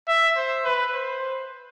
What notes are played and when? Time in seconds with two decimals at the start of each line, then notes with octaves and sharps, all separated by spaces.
0.08 E5
0.37 C5
0.65 B4
0.94 C5